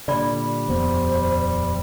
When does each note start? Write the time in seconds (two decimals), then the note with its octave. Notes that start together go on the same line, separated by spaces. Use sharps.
0.08 A#2 D3 G3 D5 B5
0.69 D#1 F2 B3 C5